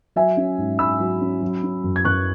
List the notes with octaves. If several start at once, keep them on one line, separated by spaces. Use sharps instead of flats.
F#3 E5 G#5
C#4
G#2
G#2 B5 E6
F#3
C#4
F#3
C#4
F#2
G#6
F#2 C#6 F#6